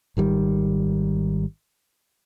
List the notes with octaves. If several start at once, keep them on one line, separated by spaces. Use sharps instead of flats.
G#1 D#3 G3